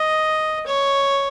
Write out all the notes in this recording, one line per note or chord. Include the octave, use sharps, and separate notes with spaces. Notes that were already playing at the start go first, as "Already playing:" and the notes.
Already playing: D#5
C#5